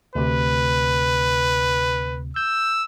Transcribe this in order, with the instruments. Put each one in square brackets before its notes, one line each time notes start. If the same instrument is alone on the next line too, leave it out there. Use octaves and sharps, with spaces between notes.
[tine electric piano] D2 C3 [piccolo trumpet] B4
[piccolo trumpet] E6 [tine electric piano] G6